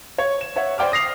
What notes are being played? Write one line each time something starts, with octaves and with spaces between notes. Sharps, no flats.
C#5
E7
C#5 E5 F#5
C5 D5 G5 D6 F6
D#6 A#6 C7 F7